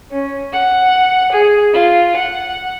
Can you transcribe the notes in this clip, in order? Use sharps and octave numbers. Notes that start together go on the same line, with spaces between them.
C#4
F#5
G#4
F4
F#5